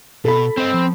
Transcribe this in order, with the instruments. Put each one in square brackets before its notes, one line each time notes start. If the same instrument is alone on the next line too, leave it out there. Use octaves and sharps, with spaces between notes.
[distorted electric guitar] B2 [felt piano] A4 B5
[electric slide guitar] C4 [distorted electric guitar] C5 D#5
[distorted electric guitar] F3